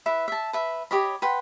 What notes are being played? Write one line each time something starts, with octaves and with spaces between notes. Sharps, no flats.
E4 B4 E5
E5 A5
B4 E5
G4 C#5 D#5 B5
B4 F#5 G5 C6